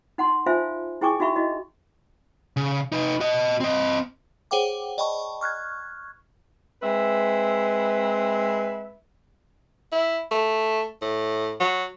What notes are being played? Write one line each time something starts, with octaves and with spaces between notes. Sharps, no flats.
D#4 F#5 A5 C6
D#4 F4 C5 E5 F5 G#5
E4 G#4 G5 G#5 C#6 D6
D#4 F#4 E5 F5 B5 C#6
E4 F#4 D#5
C#3
D#4 B4
F#4 D#5
C4 D#5
G#4 C5 C#5 F#5 G5 D6
D5 D#5 G5 A5 B5 C#6
C#6 F6 F#6 G#6
G#3 C4 B4 E5
E4
A3
A2
F#3